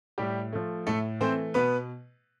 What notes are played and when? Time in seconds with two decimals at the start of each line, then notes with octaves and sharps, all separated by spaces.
0.18 A2 G3 G4
0.53 F3 A3
0.87 A2 A3 A4
1.20 E3 A3 C4 C5
1.54 B2 B3 B4